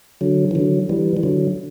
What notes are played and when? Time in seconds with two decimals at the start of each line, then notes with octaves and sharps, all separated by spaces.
0.21 D3 F#3
0.51 E3
0.55 D3 F#3
0.89 E3 G3
1.17 E3
1.23 D3 F#3